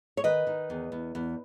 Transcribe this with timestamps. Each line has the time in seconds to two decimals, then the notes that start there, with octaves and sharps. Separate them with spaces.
0.17 C#5
0.24 D#3 B4 D#5
0.47 D#3
0.70 E2
0.92 E2
1.15 E2